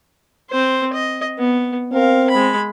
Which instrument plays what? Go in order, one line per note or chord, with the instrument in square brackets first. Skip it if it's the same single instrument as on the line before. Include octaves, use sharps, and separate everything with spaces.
[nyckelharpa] C4 C5
D#5
B3
[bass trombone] C4 [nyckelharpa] A#4 F5
[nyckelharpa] G#3 B5